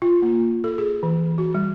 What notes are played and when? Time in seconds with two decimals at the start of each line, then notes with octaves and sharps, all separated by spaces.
0.02 F4
0.22 A#3
0.64 A4
0.78 G#4
1.03 E3
1.38 F#4
1.54 G3